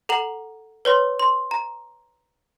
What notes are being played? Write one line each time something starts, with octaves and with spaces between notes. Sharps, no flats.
A4 F#5 A#5 F#7
B4 C#5 C6
C6
A#5